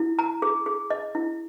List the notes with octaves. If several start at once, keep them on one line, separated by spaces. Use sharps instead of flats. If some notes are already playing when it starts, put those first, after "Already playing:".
Already playing: E4
A#5
G#4
G#4
D#5
E4